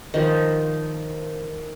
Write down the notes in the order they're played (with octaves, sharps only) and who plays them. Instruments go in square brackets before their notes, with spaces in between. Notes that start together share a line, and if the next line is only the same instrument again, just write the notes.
[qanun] D#3 F3